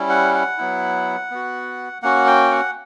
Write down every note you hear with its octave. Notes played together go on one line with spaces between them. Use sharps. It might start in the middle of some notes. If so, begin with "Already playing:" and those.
Already playing: G3 C#4 E4
F#5
F#5
F#3 B3 E4
B3 F#4
A#3 C#4 F#4 F#5
G5
F#5